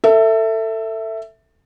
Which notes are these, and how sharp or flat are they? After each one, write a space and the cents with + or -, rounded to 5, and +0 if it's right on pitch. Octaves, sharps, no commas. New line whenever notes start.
A4 +25 E5 +0